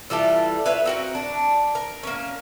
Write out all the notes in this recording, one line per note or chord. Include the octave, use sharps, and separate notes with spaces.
E3 G3 F4 A4
B4 C#5 E5 F5
C4 F#4 A#4
D4
A#4
A#3 C#4